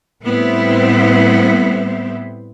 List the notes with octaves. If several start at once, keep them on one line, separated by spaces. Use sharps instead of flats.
A2 G3 B3 C4 E4 C5